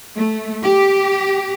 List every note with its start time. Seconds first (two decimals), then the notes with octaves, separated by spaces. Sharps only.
0.17 A3
0.64 G4